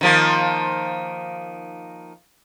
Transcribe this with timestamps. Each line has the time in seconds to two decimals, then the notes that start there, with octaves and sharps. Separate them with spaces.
0.01 D#3 F3 A#3